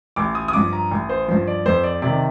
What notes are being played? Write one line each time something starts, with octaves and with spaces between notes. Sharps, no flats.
A1 D6
D#6
D#6
G2 F3 D6
A#5
A1
C5
G2 F3 C5
D5
F2 C5
D5
C3 D#3 D5